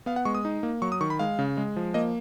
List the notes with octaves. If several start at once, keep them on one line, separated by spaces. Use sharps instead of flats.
B3 F5
F#5
G#3 C#6
D#6
D#4
A#3
F#3 C#6
D#6
D#3 C#6
B5
G#3 F5
C#3
G#3
F3
A#3 D#5